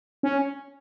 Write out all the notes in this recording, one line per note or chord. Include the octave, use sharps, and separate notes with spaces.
C#4